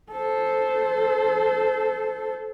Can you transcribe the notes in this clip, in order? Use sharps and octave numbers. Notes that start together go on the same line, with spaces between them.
A4 C5